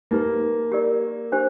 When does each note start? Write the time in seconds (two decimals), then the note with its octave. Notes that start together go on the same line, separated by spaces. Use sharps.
0.11 A#3 D#4 G4 B4
0.72 G4 A#4 D5
1.32 D4 G4 C5